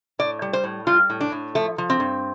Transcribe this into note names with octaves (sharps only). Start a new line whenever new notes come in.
A2 D5
G3
C5
A2
G3 F4
A2
D4
A2
F3 A3
F3
C4
G2